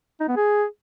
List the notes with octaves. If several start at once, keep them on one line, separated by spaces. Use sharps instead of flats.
D#4
B3
G#4